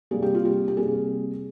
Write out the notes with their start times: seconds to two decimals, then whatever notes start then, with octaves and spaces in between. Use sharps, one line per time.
0.11 C3 G3 A#3 G#4
0.22 G4
0.35 F4
0.45 G4
0.68 G4
0.77 C3 G3 A#3 G#4